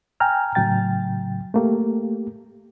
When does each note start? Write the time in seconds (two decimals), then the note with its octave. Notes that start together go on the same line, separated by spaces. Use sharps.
0.20 G5 G#5 A#5 F6
0.55 A2 C#3 F#3 G5 A6
1.54 A3 A#3 G4